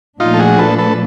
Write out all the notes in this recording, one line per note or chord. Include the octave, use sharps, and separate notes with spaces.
A#2 F3 A3 D4 D#4 F4
A4
F#4 G#4
A4 B4
A4 B4